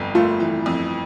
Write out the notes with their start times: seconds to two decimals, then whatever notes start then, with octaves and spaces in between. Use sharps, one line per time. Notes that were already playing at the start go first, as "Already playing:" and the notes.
Already playing: G1 F2
0.15 A3 F4
0.40 E3
0.66 F2